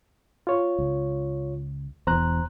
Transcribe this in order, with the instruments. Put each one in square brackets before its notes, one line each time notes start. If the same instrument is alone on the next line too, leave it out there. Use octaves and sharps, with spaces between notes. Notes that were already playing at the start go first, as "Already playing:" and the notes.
[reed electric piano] F4 C#5
[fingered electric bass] C#2
[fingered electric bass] E1 E2 [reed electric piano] C5 A#5 F#6